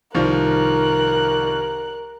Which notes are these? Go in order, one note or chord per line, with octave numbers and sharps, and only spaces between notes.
C2 D#3 F3 A#4 F#6